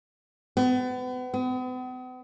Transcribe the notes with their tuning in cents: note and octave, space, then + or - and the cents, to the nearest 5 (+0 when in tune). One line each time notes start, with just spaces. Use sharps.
B3 +35
B3 +45